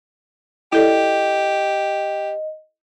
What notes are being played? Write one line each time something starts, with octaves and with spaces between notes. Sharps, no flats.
E4 G4 A4 D5 D#5